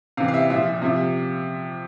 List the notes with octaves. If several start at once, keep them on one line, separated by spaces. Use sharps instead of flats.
C3 E3 F5
F5
E5
A#2 F3 E5
C3 F3 E5